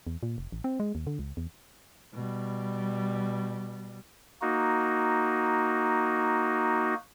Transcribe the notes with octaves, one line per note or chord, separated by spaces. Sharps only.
E2
A#2
F1
A1
C4
G#3
D#2
D3
C#2
E2
B2 G3
A#3 D#4 F#4